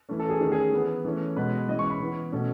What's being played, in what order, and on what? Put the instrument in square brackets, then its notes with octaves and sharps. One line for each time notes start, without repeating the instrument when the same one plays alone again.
[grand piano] E3 A3 C#4
A4
G#4
D#3 A3 C#4
G#4
E3 B3
E3 A3 C#4
B2 G#3 B3 B4
E3 G#3 C#4 D#5
C#6
B5
E3 B3
B2 A3 C#4